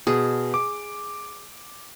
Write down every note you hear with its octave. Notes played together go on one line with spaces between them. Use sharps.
B2 G#4
D6